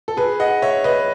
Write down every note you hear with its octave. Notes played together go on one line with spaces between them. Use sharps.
A4
G#4 B4
D#5 F#5
C#5 E5
B4 D#5